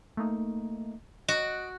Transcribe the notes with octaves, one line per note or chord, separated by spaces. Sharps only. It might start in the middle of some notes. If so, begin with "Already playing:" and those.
A3 A#3 D#4
F#4 D#5 D7